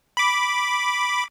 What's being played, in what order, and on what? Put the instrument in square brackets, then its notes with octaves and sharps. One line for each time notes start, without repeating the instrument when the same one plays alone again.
[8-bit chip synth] B5 D6